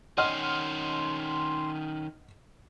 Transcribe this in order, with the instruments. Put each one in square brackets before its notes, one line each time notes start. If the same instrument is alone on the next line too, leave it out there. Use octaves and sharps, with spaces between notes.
[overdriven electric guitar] D#3 C#4 [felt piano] D#5 F#5 F6 [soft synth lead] C6